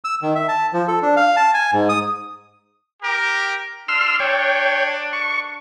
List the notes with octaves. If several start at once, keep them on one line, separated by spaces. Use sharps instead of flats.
E6
D#3
E5
A5
F3
A4
D4
F5
A5
G#5
G#2
D#6
G4 A#4
D4 C6 E6 F6
C#5 G5
C#6